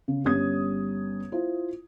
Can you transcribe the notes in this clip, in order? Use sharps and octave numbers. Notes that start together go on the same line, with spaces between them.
C#3
G1 G3 C#4 C#5 D#6 G#6
E4 F4 C5